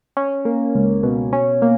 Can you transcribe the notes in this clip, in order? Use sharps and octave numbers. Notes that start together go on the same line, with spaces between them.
C#4
A#3
C#2
B2
C#4
A#3